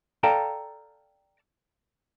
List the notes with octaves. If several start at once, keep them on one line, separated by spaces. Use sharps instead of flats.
A4 D5 F5 G5 A5 A#5